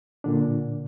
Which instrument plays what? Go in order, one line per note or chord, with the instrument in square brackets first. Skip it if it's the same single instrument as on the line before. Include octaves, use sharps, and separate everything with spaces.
[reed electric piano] A#2 D3 D4